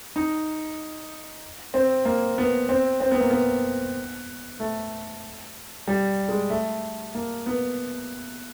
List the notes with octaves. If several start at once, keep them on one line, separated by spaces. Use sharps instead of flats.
D#4
C4
A#3
B3
C4
C4
B3
A#3
B3
A3
G3
G#3
A3
A#3
B3